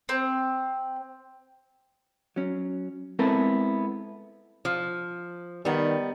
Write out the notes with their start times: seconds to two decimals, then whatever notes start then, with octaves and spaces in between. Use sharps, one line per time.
0.09 C4
2.36 F#3 C#4
3.19 G#3 B3 C4 E4 A4 A#4
4.65 F3
5.65 D#3 G3 B3